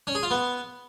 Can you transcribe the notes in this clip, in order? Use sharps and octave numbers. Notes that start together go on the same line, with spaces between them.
C#4
G#4
F4
B3